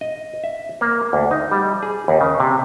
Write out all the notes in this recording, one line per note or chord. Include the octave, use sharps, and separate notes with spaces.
D#5
E5
A#3
D2
D#4
G3
G#4
D#2
C#3
C3